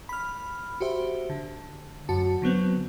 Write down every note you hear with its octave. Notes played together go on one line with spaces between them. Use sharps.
B5 F6
F#4 G4 C5 E5
D3
F#2 F#4 A5
D3 F#3 B3 C4